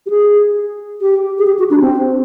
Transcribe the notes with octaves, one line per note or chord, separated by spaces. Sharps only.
G4
G#4
G4
G#4
G4
F#4
D4
C4